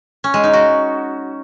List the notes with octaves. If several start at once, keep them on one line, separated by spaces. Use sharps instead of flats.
C#4
G#3
D#4
F#4